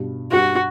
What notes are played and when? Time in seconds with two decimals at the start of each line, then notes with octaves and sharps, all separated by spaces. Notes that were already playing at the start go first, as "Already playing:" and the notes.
Already playing: G2 B2
0.32 G2 F#4